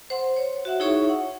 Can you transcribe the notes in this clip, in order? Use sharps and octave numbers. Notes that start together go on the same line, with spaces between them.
C5 F#5 C6
C#5
F#4 E5 F#5
D#4 E4 G#4 C#5 E5 C#6
F#5